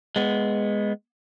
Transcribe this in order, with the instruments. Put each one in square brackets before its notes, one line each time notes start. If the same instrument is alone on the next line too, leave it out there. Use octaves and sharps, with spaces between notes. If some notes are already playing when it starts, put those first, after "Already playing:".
[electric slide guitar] G#3 B3